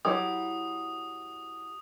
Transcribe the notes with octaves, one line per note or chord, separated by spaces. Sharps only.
F#3 E4 G4 D#6